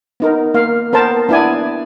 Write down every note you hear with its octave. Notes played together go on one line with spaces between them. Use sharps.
B3 D#4 A#4
A#3 F5
B3 A#4 C5 A5
B3 D4 E4 D5 G#5